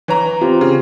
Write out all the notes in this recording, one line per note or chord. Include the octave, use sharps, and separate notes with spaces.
E3 C#5 A#5
C4 F4 G4
C#3